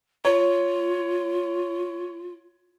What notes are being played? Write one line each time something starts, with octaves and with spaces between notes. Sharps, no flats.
F4 C#5